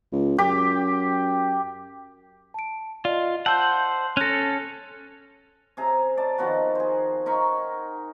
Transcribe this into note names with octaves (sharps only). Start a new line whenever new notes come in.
C#2
F#2 G4 D6
A5 D7
F4 D5 D#5
C5 F#5 A5 E6 G6
C#4 A4 F#6 A#6
C3 G#4 A#5
D5 A5
D#3 F3 B3 F#4
G#4 C5
D#4 A#4 B5 C#6